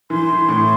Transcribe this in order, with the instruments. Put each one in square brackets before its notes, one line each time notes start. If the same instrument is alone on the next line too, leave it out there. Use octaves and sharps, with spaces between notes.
[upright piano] E3 [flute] C6
[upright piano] E3
A2